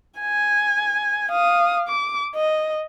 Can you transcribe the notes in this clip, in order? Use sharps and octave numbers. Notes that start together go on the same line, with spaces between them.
G#5
F5 D#6
D6
D#5